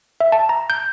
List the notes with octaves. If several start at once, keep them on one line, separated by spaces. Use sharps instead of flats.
E5
A5
A#5
G6